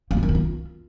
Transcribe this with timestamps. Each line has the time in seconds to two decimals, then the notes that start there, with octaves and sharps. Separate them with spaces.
0.11 A#3
0.17 F4
0.23 D#3
0.29 B3
0.35 F4